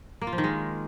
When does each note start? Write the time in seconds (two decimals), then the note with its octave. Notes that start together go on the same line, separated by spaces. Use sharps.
0.21 A#3
0.27 F4
0.33 F3
0.38 D#3
0.44 G#3